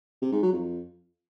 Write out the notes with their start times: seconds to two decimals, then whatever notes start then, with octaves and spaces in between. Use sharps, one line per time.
0.22 C3
0.32 G#2
0.42 F#3
0.53 F2